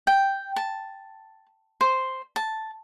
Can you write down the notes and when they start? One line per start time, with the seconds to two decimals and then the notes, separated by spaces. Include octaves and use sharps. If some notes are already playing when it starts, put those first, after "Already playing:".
0.07 G5
0.56 A5
1.81 C5
2.36 A5